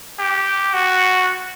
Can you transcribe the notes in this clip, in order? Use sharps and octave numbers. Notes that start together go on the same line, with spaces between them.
G4
F#4